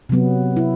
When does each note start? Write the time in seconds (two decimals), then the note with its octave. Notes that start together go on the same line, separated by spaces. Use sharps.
0.09 C3 F#3 B3
0.57 E4